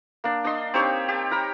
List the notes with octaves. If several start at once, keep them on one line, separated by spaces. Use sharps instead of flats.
A#3 D4
D4 D#5 C6
C4 D#4 G4 C#5
G4 A5
A#4 A#5 B5